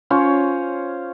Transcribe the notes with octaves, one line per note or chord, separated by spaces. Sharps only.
C#4 F4 C5 C#5